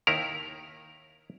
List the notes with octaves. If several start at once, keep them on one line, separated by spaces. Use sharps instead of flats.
D#2 D#3 E4 A#4 A#5